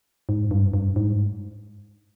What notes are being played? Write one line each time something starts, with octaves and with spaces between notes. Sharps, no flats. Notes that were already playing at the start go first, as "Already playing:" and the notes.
G#2
G2
G2
G#2